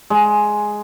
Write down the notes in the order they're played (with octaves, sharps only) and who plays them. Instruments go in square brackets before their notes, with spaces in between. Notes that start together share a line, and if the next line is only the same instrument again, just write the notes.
[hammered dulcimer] G#3